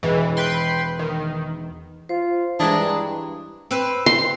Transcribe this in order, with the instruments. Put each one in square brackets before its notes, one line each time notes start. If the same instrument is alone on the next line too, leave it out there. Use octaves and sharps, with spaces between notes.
[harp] E1 [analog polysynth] E3
[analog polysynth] B4 G5 C6
D#3
[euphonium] F4 [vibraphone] C5
[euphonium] G2 [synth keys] E3 G#3 [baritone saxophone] D4 [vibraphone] A#5 D#6
[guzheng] C4 B4
[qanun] C6